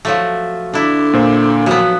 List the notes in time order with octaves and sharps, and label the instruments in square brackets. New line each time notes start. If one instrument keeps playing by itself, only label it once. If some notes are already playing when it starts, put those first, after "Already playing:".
[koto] F3 F#3 A3
[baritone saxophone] D3 [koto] D4 E4
[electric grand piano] A#2 C5
[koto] F3 B3 [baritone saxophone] F#3